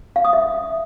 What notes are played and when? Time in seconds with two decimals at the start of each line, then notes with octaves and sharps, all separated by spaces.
0.16 F5
0.25 D#6
0.33 E5